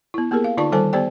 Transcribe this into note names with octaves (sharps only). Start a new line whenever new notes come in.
B3 E4
A#3 B3 G4 G#4 A#4
F5
D3 D#4 F4 D5 A5 C#6
D#3 G3 A4 C5 G#5 A5
B3 G4 C5 D5 G5